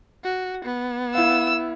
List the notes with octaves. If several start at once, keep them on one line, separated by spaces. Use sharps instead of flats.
F#4
B3
E4 F5 E6